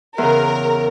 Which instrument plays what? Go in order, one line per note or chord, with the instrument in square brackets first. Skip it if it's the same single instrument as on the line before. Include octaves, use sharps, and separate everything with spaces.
[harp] E2 C#3 [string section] A#4